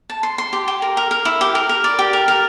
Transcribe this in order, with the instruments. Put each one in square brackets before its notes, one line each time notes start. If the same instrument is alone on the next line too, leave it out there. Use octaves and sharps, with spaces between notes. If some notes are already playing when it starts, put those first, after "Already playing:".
[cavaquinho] A5
C6
C6
G4
G4
A#4
A#4
A#4
E4
G4
A#4
A#4
D5
G4
A#4
A#4